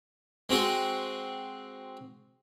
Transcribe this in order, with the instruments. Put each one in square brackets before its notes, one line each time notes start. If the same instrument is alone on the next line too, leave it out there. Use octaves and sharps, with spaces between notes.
[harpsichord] G#3 C4 F#4 G#4